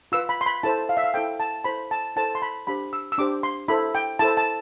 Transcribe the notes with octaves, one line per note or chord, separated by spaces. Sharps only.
F4 B4 E6
B5
C6
B5
E4 A4 C5 A5
F5
E5
F5
E4 A4 C5 G5
A5
E4 A4 C5 B5
A5
E4 A4 C5 A5
C6
B5
D4 G4 C5 B5
E6
E6
D4 G4 C5 D6
C6
E4 A4 C5 B5
G5
E4 A4 C5 A5
A5